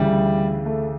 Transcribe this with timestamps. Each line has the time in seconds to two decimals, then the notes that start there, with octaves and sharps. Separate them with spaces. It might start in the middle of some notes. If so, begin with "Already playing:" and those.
Already playing: D2 C#3 E3 G3
0.66 A3